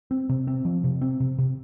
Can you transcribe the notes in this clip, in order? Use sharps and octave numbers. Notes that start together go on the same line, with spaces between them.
C4
C3
C4
F3
C3
C4
C3
C3